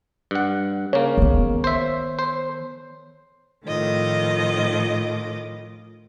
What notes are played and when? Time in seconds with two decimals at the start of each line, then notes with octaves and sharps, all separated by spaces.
0.31 G2 F#5
0.93 C#3 A#3 C#5
1.17 D#3 B3
1.64 C5 E5
2.19 C5
3.66 A2 D#3 F3 F4 D#5 D6